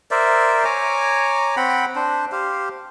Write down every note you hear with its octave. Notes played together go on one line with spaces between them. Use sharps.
A#4 C5 D5 E5
C#5 G#5 A#5 D6
C4 F#5 G5 B5
D4 C5
G4 C5 F5